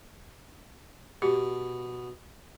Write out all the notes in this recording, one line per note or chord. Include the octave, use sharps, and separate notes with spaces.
B2 G4